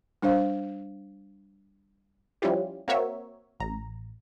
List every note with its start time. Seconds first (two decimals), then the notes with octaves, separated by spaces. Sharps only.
0.22 G3 D4 C5 F5
2.42 F3 G3 C#4 E4 F4 G4
2.88 A#3 C4 F#4 A#4 C#5 E5
3.60 A1 A#5